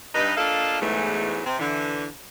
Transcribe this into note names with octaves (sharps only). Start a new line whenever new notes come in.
G2 D#4 B4
A#3 D4 F4 A4 D#5 F5
E2 G#2 E3 F#3 G#3 A3
C3 C4
D3 E3